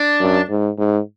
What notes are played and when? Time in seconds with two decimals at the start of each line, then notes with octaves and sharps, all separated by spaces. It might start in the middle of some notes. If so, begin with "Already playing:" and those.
Already playing: D4
0.20 F#2
0.49 G#2
0.78 G#2